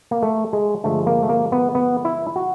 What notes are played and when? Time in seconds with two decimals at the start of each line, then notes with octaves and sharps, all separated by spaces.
0.11 A#3
0.23 A3
0.53 G#3
0.84 G2 D3 F3 G#3 A3
1.07 A#3
1.23 A3
1.29 A#3
1.52 B3
1.75 B3
2.05 E4
2.36 F#4